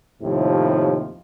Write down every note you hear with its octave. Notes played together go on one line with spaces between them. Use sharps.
D#2 A2 C3 F3